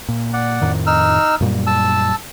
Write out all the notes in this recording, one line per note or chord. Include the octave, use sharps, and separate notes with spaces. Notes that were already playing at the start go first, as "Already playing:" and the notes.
A#2
D5 F#5
F2 A2 D#3
D#4 E6 F6
F#2 A#2 G3
A5 E6